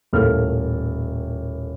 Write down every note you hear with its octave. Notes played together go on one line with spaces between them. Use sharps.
D#1 A2 A#3 A4 F6